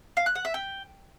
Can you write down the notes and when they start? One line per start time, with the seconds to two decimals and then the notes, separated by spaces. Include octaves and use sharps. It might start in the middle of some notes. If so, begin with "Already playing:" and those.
0.17 F5
0.26 F#6
0.35 F#5
0.45 E5
0.54 G5